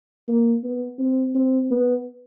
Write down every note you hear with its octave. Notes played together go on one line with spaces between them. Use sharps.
A#3
B3
C4
C4
B3